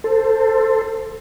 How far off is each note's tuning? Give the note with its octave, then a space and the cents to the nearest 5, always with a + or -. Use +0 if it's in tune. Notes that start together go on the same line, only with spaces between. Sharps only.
A4 +20 C5 +0